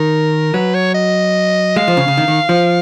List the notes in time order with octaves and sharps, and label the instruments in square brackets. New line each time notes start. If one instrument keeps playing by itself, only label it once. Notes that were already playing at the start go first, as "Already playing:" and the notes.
Already playing: [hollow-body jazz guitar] D#3 [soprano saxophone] A#4
[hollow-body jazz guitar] F#3 [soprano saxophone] B4
[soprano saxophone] C#5
D#5
[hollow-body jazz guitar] G#3 [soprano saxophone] F5
[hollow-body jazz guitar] F3
C#3
C#3
D#3
D#3
F3